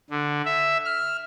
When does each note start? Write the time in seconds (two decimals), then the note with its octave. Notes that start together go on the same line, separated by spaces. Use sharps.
0.10 D3
0.45 E5
0.85 F6